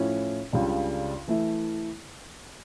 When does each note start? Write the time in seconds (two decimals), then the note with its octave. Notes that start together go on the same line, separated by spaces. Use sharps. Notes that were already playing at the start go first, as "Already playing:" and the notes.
Already playing: A2 F3 C#4 E4
0.53 C#2 C#3 G3 D4
1.28 E3 A3 E4